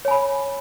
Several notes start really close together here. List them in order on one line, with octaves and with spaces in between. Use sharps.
C#5 G#5 B5